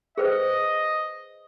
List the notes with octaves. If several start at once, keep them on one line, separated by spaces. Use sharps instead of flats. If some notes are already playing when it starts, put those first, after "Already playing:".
G#4 B4 C5 D#5